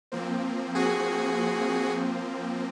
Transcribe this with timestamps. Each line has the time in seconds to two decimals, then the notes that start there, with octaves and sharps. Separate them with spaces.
0.12 F3 A#3 C4
0.75 F#4 G#4